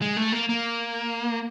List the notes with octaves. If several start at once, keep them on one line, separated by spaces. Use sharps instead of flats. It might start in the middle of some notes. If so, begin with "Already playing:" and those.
G#3
A3
A#3
A#3